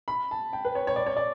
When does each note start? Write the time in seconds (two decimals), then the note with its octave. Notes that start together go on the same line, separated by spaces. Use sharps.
0.08 B5
0.31 A5
0.53 G5
0.65 B4
0.75 C#5
0.87 C#5
0.96 D5
1.06 C#5
1.17 D5